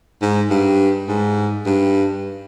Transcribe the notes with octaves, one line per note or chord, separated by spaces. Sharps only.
G#2
G2
G#2
G2